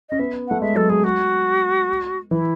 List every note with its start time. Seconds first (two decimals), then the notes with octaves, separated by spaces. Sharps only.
0.09 C#4 D#5
0.19 B3 E5
0.47 A3 F#5
0.61 G#3 E5
0.75 F#3 A4
0.89 G#3 G#4
1.04 F#4
2.31 E3 E4